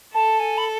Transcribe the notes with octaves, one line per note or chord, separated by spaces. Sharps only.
A4 A5
G#5
B5